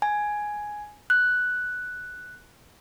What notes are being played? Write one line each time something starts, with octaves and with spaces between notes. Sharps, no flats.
G#5
F#6